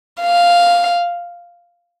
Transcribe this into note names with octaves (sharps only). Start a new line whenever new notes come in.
F5